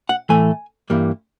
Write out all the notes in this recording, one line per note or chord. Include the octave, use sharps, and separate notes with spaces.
F#5
A2 E3 A3 G#5
G2 E3 G3 A#3